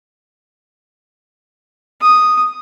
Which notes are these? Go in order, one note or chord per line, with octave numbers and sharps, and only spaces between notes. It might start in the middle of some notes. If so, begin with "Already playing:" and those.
D#6